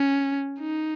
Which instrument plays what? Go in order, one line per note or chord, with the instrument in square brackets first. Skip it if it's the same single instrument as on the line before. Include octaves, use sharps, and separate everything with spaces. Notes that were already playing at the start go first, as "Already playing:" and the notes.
Already playing: [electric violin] C#4
D#4